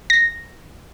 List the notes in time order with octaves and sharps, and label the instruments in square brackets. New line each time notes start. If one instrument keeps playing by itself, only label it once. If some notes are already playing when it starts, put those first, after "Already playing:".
[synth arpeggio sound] A#6